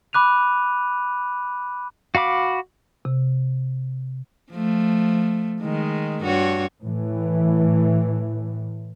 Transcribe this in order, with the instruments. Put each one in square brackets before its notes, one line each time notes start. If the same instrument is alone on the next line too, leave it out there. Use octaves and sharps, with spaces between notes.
[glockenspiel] B5 D6 F#6 D#7 F7
[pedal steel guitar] F#4 F5 B5 D6
[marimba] C3
[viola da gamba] F3 A3
D#3 G#3
G2 F#4 C#5
[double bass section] A2 E3